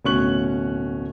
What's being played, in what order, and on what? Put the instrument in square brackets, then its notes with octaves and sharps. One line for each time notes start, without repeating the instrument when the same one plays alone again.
[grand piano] D1 B2 C#4 C#6 F#6 F#7